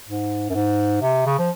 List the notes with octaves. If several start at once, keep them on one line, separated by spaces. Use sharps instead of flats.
G#2
F#2
G#2
C3
C#3
F3